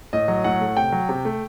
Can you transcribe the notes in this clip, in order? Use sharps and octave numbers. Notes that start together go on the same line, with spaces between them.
A2 D#5
F#3
A2 F#5
A3
C3 G5
F#3
C3
A3